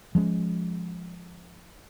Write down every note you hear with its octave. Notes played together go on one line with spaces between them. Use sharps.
F3 G#3 C#4